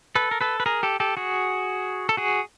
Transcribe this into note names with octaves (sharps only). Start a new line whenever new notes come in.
A4 B4
A#4
A4 B4
B4
G#4 A#4
G4 A4
G4 A4
F#4 G#4
A4
F#4 G#4